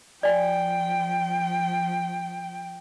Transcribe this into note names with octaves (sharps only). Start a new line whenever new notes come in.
F3 D5 G5 G#5